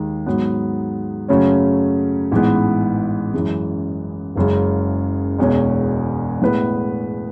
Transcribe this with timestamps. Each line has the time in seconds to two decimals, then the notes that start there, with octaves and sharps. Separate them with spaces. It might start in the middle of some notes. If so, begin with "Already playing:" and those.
Already playing: D#2 D#3 G#3
0.26 G#2 F#3 B3
1.28 F#2 C#3 F#3 A3 C#4
2.32 A1 G#2 E3 G#3 B3
3.34 F#2 E3 G#3
4.36 F#1 F#2 C#3 G#3
5.38 E1 E2 B2 G#3 C#4
6.42 A2 G#3 B3 E4 B4